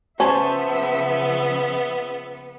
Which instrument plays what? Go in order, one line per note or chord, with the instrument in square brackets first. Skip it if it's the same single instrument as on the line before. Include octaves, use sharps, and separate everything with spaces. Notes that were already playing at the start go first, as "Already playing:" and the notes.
[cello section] C#3 F3 E5 [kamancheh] B3 [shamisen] C#4 [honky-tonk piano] C5 A5